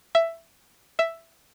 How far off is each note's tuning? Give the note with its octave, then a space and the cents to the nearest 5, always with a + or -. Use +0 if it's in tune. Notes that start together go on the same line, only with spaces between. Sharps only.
E5 +10
E5 +5